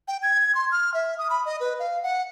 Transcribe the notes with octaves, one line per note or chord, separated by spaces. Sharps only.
G5
G#6
C6
F6
E5
D#6
B5
D#5
B4
F5
F#5